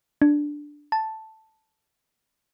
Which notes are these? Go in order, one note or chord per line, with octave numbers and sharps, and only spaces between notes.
D4
A5